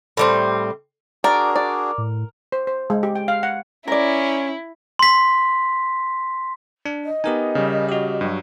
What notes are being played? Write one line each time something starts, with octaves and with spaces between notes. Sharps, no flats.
A2 G3 C4
D4 F#4 G#4 A#4 D5
D5
A2
C5
C5
G#3
G4
G5
F5
F#5
C#4 E4 A#4 D5
C6 B6
D4
D#5
B3 D#4 G4 A#4 G#5
C#3 G3
F#4 G4
G2 F#3